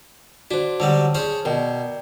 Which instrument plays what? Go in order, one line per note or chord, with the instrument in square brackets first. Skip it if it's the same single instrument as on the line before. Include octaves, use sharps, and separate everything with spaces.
[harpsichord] D4 [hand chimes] F#4 C5
[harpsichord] D3 F#3 G3 [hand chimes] A5
[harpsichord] C#4 G#4 C5
[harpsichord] B2 [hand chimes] A#4 D5 G5